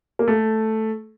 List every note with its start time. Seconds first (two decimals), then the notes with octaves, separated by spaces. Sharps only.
0.19 A#3
0.28 A3